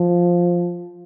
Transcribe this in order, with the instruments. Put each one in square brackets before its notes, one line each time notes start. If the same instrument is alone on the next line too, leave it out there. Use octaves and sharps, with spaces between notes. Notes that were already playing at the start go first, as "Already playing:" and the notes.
Already playing: [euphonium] F3